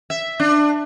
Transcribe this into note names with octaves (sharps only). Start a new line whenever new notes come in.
E5
D4